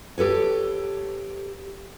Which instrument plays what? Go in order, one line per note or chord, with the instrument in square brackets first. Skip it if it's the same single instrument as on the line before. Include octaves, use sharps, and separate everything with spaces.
[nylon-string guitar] G4 A4 B4 C#5